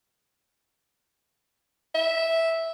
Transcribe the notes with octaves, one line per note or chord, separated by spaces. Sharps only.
E5